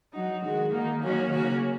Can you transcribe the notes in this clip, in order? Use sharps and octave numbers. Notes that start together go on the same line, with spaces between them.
F#3 D#4 F#4
D#3 G#3 F#4
D#3 A#3 D#4
D#3 F#3 A#3 C#4 F#4
C#3 A#3 C#4 F#4